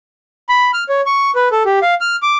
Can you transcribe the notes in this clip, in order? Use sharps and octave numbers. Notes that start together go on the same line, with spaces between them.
B5
F6
C#5
C#6
B4
A4
G4
F5
F6
D6